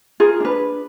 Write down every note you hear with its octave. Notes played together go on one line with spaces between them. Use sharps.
F4 G#4 A#4
D4 B4